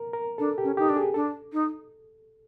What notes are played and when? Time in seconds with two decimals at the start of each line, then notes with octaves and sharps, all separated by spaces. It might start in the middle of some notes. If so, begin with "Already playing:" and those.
Already playing: A#4
0.13 A#4
0.38 D4 A4
0.58 G4
0.64 C#4
0.77 D#4 G4
0.89 D4
0.96 G#4
1.14 D4 A4
1.53 D#4